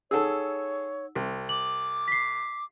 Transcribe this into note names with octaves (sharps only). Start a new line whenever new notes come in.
D#4 G#4 A4 C#5 F#5 E6
C2
D6 F#7
B6 C7